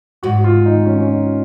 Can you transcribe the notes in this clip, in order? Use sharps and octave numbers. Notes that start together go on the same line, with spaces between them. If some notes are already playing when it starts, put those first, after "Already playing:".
G#2 F#4
F4
D#4
C#4
C#4
D#4